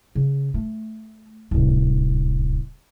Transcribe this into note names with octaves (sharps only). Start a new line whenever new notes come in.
C#3
A3
D1 C2